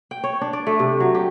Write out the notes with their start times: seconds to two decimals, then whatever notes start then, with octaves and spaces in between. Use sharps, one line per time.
0.11 G5
0.24 C#5
0.41 D4
0.53 D5
0.67 A3
0.79 C3
1.00 F#3
1.14 G4